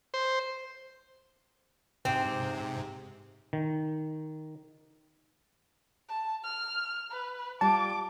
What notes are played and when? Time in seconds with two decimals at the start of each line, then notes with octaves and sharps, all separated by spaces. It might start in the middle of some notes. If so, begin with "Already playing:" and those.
0.14 C5
2.05 G#2 C3 C4 G4
3.53 D#3
6.09 A5
6.44 F6
7.11 B4
7.61 G3 F4 A5 D6